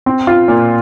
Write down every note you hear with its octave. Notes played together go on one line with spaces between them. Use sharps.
C4
F4
A#2